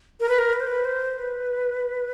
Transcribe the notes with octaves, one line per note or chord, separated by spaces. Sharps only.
A#4
B4
A#4
B4
C5
B4
C5
B4